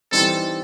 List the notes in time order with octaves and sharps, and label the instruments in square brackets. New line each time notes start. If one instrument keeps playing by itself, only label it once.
[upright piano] E3 G3 C4 D#4 [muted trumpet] A4